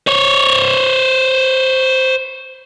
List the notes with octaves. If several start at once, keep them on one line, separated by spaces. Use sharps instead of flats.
C5 C#5